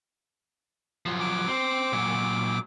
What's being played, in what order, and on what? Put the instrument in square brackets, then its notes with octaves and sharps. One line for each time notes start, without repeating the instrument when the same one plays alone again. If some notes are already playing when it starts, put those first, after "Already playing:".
[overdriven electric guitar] F3 F#3
[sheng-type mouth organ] D6
[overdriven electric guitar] C4
A#2 F#3